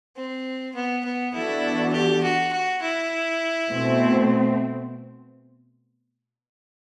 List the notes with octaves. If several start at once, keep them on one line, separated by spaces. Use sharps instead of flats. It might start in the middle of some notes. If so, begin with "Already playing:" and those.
C4
B3
B3
E3 B3 D4 E4 F#4 A4
G4
F#4
F#4
E4
B2 A3 C4